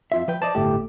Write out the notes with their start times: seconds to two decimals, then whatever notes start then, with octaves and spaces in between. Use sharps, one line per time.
0.12 F2 F4 E5
0.28 F3 B4 G5
0.42 C5 D5 D#5 A5
0.55 G1 A2 A3 G4